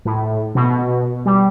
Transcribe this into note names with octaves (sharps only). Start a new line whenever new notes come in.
A2
B2
G3